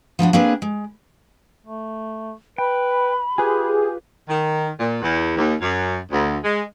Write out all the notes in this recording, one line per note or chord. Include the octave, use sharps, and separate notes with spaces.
F3 B3 D4 F#4
A#3 C4 D4 G#4 B4
G#3
A3
B4 G5 B5
F4 G4 G#4 B4
D#3
A#2
E2
D#2
F#2
D2
G#3